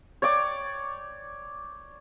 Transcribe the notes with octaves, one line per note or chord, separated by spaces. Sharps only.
C#5 D5 G5 D6